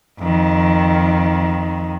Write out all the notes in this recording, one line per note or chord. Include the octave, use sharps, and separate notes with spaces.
F2 D#3